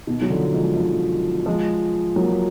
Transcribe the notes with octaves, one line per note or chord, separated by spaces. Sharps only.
B2 D#3
F#3
D3 F3
F3 G#3
D3 F3
F3 G#3
F#3 A#3